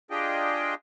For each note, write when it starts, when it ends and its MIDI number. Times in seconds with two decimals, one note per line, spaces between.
0.11 0.74 62
0.11 0.74 65
0.11 0.74 67
0.11 0.74 68
0.11 0.74 75
0.11 0.74 79